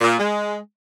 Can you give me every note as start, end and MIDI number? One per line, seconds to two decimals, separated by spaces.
0.01 0.15 46
0.19 0.56 56